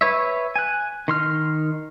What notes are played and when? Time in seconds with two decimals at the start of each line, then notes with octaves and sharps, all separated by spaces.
0.01 B4 C#5 E5
0.56 G#5 F#6
1.08 D#3 C6 F6